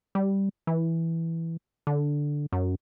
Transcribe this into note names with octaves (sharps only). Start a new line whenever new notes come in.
G3
E3
D3
F#2